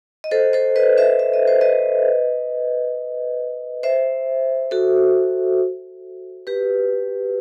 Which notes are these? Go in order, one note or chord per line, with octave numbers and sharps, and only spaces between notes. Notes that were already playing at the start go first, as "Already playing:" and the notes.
D#5
A4 C5
A4 C5
B4 D#5
C5 E5
E5
D#5
C5
B4 D#5
C5 E5
F#4 A4
G4 B4